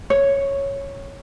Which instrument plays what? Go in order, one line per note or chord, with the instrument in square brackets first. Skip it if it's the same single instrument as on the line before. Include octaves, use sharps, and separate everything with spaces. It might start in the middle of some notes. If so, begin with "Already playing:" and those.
[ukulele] C#5